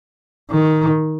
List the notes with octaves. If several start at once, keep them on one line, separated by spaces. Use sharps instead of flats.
D#3